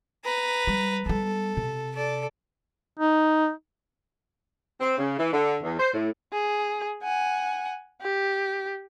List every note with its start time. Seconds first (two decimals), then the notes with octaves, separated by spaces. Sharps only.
0.25 B4 A#5
0.67 G3
1.06 G3 B3 A4
1.57 C3
1.95 A4 D5
3.00 D#4
4.80 C4
4.98 C#3
5.18 E3
5.32 D3
5.63 E2
5.79 C5
5.93 A2
6.32 G#4
7.03 F#5 G#5
8.01 G4